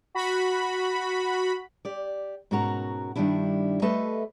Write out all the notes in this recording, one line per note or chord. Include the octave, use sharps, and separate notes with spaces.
F#4 B5
G4 D5
G#2 B2 C#4 F#4 A#4 A#5
G2 D#3 G3 G#3 D4 E4
G3 A3 A4 B4 D#5 E5